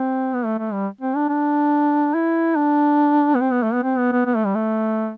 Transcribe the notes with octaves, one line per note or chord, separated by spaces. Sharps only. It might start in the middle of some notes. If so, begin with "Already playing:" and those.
Already playing: C4
B3
A3
A3
G3
C4
D4
D4
E4
D4
B3
C4
B3
A3
B3
C4
B3
B3
B3
A3
G3
A3